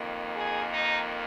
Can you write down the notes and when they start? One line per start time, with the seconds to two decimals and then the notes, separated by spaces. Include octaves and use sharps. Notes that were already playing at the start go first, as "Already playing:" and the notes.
Already playing: F2 D#3 A#3
0.36 G#4
0.73 D#4